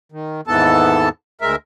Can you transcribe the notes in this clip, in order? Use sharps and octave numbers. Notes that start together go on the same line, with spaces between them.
D#3
D#2 G#2 E3 B3 A4 A5
D2 G#3 A#4 E5